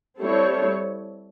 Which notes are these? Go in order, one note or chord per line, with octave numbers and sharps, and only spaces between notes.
G3 C4 E4 A4 C#5